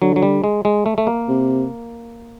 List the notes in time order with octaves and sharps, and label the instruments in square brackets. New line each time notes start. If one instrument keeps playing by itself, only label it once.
[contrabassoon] D3 [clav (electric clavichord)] F#3
[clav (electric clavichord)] F#3
G3
G#3
G#3
A3
A3
A#3
[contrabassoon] C3